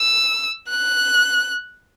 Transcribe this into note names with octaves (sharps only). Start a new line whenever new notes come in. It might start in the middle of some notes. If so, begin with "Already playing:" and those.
Already playing: E6
F#6